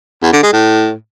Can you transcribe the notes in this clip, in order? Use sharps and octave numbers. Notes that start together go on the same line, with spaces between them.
E2
D3
G#3
A2